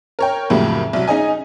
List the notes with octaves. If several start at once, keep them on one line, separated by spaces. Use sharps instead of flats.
A#4 C#5 G5
F2 A2 C#3 F#3 G3 A#3
C2 F#3
C#4 D#4 G#4 D#5 G#5